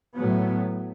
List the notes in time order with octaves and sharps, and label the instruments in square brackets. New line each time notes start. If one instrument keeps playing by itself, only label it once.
[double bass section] A2 F#3 B3